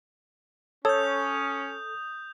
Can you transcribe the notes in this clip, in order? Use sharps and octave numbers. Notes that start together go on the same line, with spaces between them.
C#4 A4 C#5 D#6 G6